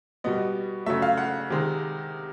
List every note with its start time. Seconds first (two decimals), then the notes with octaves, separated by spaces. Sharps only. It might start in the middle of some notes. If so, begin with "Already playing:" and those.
0.24 B2 G3 B3 D#5
0.86 C#3 F#3 A3 E5
1.02 F5
1.17 F#5
1.50 C3 D#3 G#3